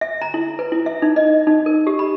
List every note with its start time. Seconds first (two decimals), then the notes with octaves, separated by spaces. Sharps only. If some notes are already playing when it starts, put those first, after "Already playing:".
0.01 E5
0.22 A#5
0.34 E4
0.59 B4
0.72 E4
0.86 E5
1.02 D#4
1.16 D#5
1.47 D#4
1.66 A#4
1.87 G4
1.99 B5